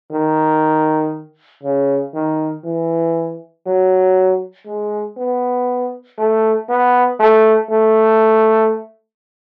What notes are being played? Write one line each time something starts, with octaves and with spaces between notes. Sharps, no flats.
D#3
C#3
D#3
E3
F#3
G#3
B3
A3
B3
A3
A3